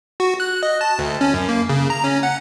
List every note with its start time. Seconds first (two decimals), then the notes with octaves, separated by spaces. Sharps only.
0.20 F#4
0.40 F#6
0.63 D#5
0.81 A5
0.99 D2
1.21 C#4
1.34 F#2
1.49 A#3
1.69 C#3
1.90 A#5
2.04 C#4
2.23 F#5